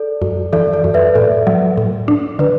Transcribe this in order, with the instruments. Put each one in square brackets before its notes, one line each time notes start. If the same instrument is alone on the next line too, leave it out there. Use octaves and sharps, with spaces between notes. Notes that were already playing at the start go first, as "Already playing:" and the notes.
Already playing: [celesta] A4 D5
[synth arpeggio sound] F#2
[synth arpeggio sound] E3 [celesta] A4 D5
[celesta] A4 D5
[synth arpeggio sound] F#2
[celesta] B4 E5
[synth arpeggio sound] A2 [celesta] A4 D5
[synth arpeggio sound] F#3
A2
D4
[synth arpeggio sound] D3 [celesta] B4